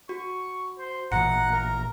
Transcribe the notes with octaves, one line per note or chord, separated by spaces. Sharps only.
F#4 C#6
C5
A1 A#2 E3 F#5 A#5 C#7
A#4